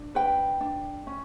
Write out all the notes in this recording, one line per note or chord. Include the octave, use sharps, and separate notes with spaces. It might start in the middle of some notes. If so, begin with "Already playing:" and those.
Already playing: D4
B4 G5
D4
C#4